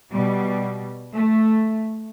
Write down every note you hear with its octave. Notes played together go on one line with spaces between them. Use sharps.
B2 G3
A3